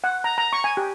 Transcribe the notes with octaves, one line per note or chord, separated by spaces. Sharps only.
F#5
A#5
A#5
C#6
G#5
G4